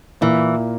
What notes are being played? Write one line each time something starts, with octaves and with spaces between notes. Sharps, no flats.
A#2 E3 A#3